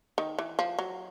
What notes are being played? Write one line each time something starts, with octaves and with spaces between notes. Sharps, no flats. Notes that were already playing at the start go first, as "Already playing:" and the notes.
D#3
E3
F3
F#3